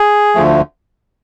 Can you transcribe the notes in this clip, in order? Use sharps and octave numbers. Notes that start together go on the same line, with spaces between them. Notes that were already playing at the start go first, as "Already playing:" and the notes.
Already playing: G#4
D2 D3 F3 A3